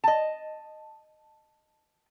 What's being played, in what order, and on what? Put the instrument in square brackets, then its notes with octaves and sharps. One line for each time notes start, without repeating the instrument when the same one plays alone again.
[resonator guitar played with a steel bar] D#5 A5